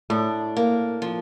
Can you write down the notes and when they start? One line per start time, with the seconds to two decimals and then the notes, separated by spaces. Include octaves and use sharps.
0.10 A2 D4
0.57 A#3
1.02 F3